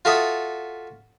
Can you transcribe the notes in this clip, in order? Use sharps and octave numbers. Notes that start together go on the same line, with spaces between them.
F4 F#4 A4 E5 D#6